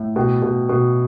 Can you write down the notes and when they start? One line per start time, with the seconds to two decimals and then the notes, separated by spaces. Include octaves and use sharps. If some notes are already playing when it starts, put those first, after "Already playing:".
Already playing: A2
0.16 B2 G5
0.42 B2
0.69 B2